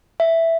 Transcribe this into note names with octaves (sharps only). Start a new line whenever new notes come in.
E5